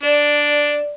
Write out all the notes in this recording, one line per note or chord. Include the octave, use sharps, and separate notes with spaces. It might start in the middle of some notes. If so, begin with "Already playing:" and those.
D4 D5